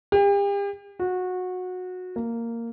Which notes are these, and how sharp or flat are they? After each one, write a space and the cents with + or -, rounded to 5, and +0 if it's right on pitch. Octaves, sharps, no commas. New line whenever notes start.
G4 +40
F#4 -20
A#3 -10